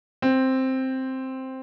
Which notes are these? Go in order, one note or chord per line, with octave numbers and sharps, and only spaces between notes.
C4